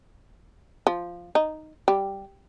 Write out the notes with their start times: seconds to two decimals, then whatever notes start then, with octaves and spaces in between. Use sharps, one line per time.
0.87 F3
1.35 D#4
1.88 G3